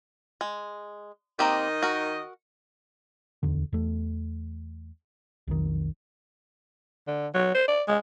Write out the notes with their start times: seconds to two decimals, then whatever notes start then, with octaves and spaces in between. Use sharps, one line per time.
0.41 G#3
1.39 D#3 A#3 C4 G4 D#5
1.83 F#4 A#4
3.43 D1 E2 D3
3.73 E2 A3
5.47 B1 F2 D#3
7.07 D3
7.34 F#3
7.54 C5
7.68 D5
7.88 G#3